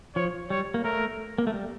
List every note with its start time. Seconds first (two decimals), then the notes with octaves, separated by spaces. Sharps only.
0.16 F3 C#5
0.50 G3 C#5
0.74 A#3
0.84 A3 A#4
1.38 A#3
1.47 A3
1.54 G3